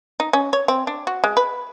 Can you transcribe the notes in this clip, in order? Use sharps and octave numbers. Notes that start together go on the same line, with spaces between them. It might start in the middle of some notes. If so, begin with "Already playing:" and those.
D#4
C#4
C#5
C4
D4
F#4
G#3
B4